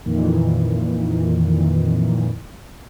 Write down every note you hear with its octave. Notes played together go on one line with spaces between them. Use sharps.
F2 A#2 D#3 E3